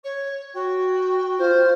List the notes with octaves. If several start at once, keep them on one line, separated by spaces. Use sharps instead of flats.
C#5
F#4 G5
F4 C5